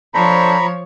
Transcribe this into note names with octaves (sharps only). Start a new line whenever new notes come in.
F3 D4 A4 C5 C#5 A#5 B5